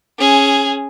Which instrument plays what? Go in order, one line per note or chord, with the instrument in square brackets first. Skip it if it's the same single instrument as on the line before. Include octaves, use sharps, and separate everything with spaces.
[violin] C#4 G#4